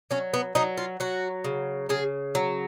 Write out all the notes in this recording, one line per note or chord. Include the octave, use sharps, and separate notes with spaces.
F#3 C#4
B3
F#3 D#4
F4
F#3 F#4
C#3
C#3 G#4
F#3